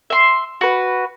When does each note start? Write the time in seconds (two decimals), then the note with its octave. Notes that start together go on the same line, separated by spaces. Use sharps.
0.10 E5 C6
0.61 F#4 B4